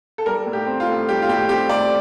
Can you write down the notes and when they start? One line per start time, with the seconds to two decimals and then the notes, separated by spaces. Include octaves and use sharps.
0.18 A4
0.26 G3 A#4
0.46 A2
0.53 G4
0.66 C4
0.80 F4
0.88 A2
1.08 G3 G4
1.22 F4
1.28 A2 G4
1.49 C4 G4
1.69 A2 D5